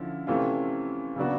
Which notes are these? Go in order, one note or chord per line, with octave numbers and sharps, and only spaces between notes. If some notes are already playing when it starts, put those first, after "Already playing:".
Already playing: D3 F3 C#4 E4
C3 E3 A3 C#4 F4
C#3 F#3 B3 D4 F#4